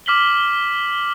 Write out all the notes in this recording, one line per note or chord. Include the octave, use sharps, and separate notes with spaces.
D6 F6 B6 F#7 G7